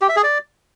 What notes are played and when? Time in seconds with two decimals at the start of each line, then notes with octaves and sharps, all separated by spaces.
0.01 G4
0.09 E5
0.16 G#4
0.24 D5